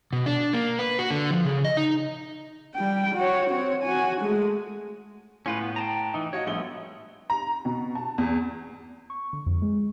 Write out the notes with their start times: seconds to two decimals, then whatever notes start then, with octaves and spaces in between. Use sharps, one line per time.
0.13 B2
0.26 D4
0.53 A#3
0.79 B4
0.99 F#4
1.11 D3
1.31 F3
1.45 C#3
1.64 D#5
1.77 D#4
2.75 G3 G5
3.15 F#4 C#5
3.50 C4 C#5
3.83 F#4 G#5
4.21 G#3 A3
5.46 A2 C#4 F4 B4
5.61 B3
5.76 G5 A5 A#5
6.14 E3 D#4
6.33 F#4 C#5 D#5 F5
6.46 A#1 G3 A3 B3 G7
7.30 A#5
7.65 B2
7.95 A5
8.18 E2
9.10 C#6
9.33 D3
9.46 F2
9.62 G#3